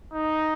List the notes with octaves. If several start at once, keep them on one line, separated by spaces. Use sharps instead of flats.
D#4